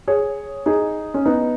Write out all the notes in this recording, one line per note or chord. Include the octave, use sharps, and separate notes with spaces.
G#4 C#5
D#4 G#4
C#4
B3 D#4